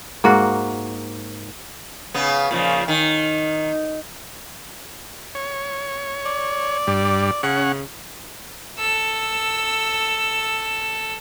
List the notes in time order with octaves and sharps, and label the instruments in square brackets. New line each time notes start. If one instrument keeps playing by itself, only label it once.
[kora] G#2 A#3 F#4
[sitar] C#3 B3
A#2 C#3 F3
D#3
[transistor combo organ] C#5
[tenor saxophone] D5
[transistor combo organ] G2 G3
[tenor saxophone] C#3 [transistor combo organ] C#4 F#5
[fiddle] A4 E6